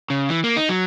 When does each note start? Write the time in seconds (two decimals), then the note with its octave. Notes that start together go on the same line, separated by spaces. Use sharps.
0.10 C#3
0.30 E3
0.44 A#3
0.57 D#4
0.69 F#3